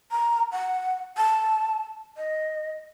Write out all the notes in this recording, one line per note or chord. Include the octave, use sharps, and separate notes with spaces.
A#5
F#5
A5
D#5